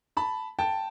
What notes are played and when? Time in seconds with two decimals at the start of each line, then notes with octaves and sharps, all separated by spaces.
0.17 A5 B5
0.59 G5 A5